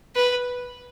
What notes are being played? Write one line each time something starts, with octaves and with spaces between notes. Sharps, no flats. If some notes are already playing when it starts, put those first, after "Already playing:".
B4